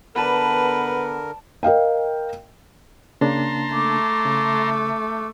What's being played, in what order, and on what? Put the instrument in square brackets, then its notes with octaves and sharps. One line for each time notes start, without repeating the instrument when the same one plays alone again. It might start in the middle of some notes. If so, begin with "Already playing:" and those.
[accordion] D3 A#4 [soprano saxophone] B3 [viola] B4 [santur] D5 A5 B5
[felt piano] A#4 D#5 F5 G5
[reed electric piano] C#3 A#3 D4 [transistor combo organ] A5 A#5 C6
[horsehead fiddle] A3 [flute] D6
[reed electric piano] C#3